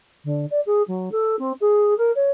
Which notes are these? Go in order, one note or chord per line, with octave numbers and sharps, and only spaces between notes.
D3
D5
G#4
F#3
A4
C4
G#4
A#4
C#5